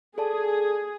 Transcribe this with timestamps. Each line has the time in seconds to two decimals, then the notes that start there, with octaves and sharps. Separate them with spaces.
0.18 G#4 A4 D5 A5